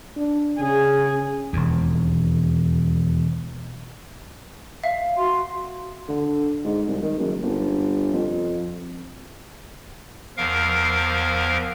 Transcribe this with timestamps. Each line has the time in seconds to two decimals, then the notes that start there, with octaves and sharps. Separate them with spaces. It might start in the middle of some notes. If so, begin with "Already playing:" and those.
0.17 D4
0.59 C#3 G#4
1.53 E1 D#2
4.84 E5 F5
5.16 F#4 C6
6.09 D3
6.65 G#2
6.87 C2
7.02 D#3
7.19 F#1
7.43 G1
8.13 F2
10.37 E2 F3 A#4 F5